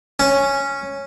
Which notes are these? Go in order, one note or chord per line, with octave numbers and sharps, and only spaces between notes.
C#4